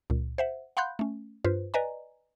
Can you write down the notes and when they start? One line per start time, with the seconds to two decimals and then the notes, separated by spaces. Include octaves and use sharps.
0.10 C#2 A#2
0.38 C5 E5 F#5
0.77 F5 F#5 B5 C6 F#6 G6
0.99 A3 C#4
1.45 G2 F4 B4 C5
1.74 B4 D5 D#5 G#5 A#5